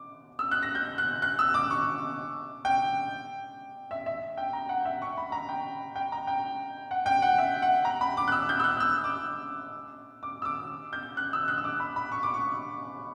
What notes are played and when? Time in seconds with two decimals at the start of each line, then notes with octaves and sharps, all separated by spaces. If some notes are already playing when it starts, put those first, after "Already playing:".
Already playing: D6
0.39 E6
0.51 F#6
0.63 A#6
0.75 G6
0.98 F#6
1.22 F#6
1.39 E6
1.54 D6
1.70 C#6
2.65 G5
3.91 E5
4.06 E5
4.37 G5
4.53 A#5
4.69 F#5
4.85 E5
5.02 C#6
5.17 B5
5.32 A#5
5.49 G5
5.96 G5
6.12 A#5
6.27 G5
6.91 F#5
7.06 G5
7.22 F#5
7.38 E5
7.62 F#5
7.85 A#5
8.01 B5
8.17 D6
8.28 F#6
8.32 E6
8.49 G6
8.60 E6
8.64 F#6
8.80 E6
9.04 D6
10.23 D6
10.42 E6
10.45 D6
10.93 G6
11.17 F#6
11.33 E6
11.48 F#6
11.58 E6
11.64 D6
11.80 B5
11.96 B5
12.12 C#6
12.23 D6
12.34 C#6